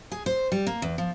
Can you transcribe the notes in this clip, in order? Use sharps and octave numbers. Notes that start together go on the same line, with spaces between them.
G#4
C5
G3
A#3
E2
F3